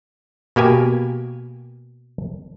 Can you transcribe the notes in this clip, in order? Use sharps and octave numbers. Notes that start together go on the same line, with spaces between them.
B2 A#3 G4 G#5